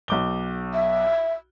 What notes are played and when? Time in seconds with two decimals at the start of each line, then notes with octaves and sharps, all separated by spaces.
0.08 B1 D6 G7
0.74 E5